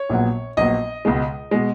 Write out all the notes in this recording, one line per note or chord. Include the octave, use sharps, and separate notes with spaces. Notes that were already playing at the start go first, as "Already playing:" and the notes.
Already playing: C#5
A#1 A#2 F#3 B3
A#1 A#2 F#3 B3 D#5
C#2 B2 G#3
B2 G#3